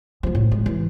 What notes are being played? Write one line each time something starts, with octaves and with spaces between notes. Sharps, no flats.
F3 A3
A2
G#3
E3